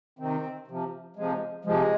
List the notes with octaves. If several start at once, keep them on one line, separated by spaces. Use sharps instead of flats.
C3 D#3 C4
C3 F3
C3 F3 G#3
C3 F3 G#3